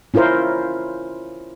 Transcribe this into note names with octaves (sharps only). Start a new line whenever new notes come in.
C#4 E4 F4 A#4 C5